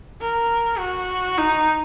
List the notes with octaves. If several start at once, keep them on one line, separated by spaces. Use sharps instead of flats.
A#4
F#4
D#4